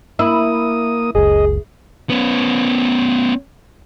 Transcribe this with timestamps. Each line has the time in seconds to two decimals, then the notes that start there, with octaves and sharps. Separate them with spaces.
0.19 A#3 E4 D#6
1.15 F#1 C#2 G#4 D#5
2.10 B3 C#4